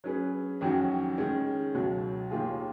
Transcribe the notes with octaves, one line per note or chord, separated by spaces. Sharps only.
F#3 C#4 G#4 B4
F2 D#3 F#3 C#4 F#4
D#3 G#3 C#4
C#2 B2 F#3
D#2 D#3 A#3 F4 G#4